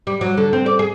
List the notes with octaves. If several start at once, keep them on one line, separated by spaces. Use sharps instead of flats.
G3
F#3
D3
C4
D5
G#4